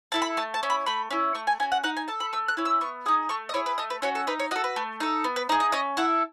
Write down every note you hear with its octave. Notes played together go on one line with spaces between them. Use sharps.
E4 A4 A5
B5
A3 A5
A5
C#4 E4
B5
A3 B5
C#4 E4
A3 C#6
G#5
C#4 F#4 G#5
F#5
D#4 F#5
G#5
A4 A5
B5
A3 E6
F#6
C#4 E4
E6
B3 C#6
D#4 G#4 D#6
A3 C#6
D#5
E4 G#4 C#5
B4
A3 D#5
B4
C#4 F#4 C#5
A4
D#4 B4
C#5
F#4 A4 D#5
B4
A3
D#4 A4
B3
B4
D#4 G#4 D#5
D#5
C#4 D#5
E4 A4 F#5